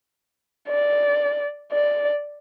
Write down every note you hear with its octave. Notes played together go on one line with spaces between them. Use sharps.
D5
D5